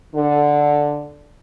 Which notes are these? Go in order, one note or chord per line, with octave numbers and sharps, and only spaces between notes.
D3